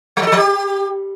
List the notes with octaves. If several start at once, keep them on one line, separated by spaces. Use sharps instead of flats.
G3
F3
A4
F3
G4